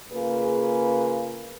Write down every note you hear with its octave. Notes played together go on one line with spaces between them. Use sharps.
C#3 A#3 F4 G#4 B4